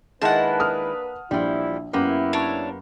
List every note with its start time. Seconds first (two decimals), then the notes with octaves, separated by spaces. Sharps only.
0.22 D#3 G#3 A#3 D4 E4 B4 F#5 A5
0.60 D#6 F6
1.31 A#1 E2 F3 G3 E4
1.93 F#2 A#3 B3 E4 G4
2.33 D4 C#5